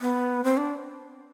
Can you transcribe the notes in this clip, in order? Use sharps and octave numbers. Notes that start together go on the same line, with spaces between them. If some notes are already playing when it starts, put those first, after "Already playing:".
B3
C4
D4